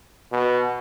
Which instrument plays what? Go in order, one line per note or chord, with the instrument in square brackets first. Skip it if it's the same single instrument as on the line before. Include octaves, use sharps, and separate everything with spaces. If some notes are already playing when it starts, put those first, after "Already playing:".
[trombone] B2